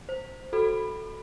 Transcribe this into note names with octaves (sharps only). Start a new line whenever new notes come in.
C5
F#4 A4 B5